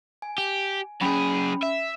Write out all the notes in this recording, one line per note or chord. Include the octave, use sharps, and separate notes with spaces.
G#5
G4
F#2 C#4 G#4 G5 B5
E5